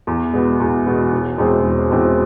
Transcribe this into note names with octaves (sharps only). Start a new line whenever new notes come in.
E2
B2 G#3 B3
E2
B2 G#3 B3
E1
E2 B2 G#3 C4
E1
E2 B2 G#3 C4